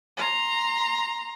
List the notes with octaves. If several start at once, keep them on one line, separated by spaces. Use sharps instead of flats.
A#5 C6